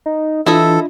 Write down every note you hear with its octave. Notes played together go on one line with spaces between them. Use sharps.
D#4
E3 D4 E4 F4 A4 D#5 E5